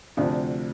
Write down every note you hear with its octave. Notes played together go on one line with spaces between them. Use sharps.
D2 C3 F3 D4